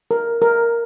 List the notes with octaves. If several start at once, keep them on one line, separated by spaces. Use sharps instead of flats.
A#4
A#4